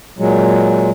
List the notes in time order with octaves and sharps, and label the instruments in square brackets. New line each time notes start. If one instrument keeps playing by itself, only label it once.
[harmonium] A#2 F#3 G#3